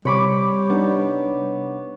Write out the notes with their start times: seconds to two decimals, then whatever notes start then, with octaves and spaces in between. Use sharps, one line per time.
0.05 C3 G3 C#5 B5 D6
0.70 B3 D4 D#4